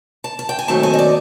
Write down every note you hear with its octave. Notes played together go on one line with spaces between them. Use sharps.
A5
A5
G5
G#5
D#2 D#3 F#3 A3 C4 A5
G#5
D#5
D5